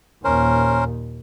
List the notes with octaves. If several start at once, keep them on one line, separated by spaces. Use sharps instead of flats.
D#2 A#2 C#4 A#4 C5